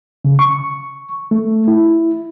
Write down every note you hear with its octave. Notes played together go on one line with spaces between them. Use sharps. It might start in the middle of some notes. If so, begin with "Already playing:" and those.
C#3
C#6
A3
E4